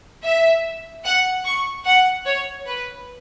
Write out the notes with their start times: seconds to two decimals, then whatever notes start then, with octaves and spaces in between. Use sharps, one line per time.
0.24 E5
1.05 F#5
1.45 C#6
1.86 F#5
2.26 C#5
2.67 B4